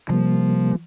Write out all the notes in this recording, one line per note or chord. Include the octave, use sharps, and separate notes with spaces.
C3 F3 G3 A#3